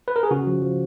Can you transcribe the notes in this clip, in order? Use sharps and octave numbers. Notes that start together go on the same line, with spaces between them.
B4
A#4
G#4
C#3 F#4
F3
F3